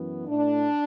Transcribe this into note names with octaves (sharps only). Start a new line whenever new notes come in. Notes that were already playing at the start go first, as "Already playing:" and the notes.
Already playing: F#2 E3 B3
A2 A3 D4